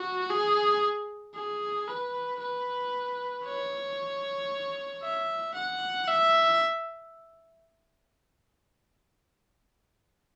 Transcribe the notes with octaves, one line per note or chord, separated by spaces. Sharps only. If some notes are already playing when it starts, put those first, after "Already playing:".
Already playing: F#4
G#4
G#4
B4
B4
C#5
E5
F#5
E5